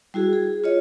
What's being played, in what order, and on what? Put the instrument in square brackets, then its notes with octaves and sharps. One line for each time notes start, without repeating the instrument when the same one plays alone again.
[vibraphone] G3 E4 F#4 G#4
G#4
F4 C#5 D#5